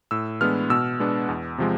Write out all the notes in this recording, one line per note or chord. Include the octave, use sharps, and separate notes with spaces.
A2 E6
E3 G#3 B3 D4 F6
B2 E6
G#3 B3 D4
E2
C3 F3 G#3